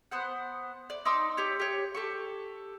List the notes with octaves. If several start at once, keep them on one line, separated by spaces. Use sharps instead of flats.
B3 C5 F#5
D5
D#4 C6 D6 E6
G4 C#5
G4 C#5
G4 A4 C#6